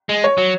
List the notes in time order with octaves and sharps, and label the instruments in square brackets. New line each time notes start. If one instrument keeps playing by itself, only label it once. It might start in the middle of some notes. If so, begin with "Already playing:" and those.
[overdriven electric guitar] G#3
[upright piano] C#5
[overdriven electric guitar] F#3